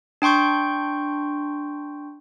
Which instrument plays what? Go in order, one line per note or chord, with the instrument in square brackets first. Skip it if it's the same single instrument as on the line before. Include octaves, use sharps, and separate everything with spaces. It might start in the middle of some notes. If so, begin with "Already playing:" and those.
[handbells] D4 G5 C6 C#6 G6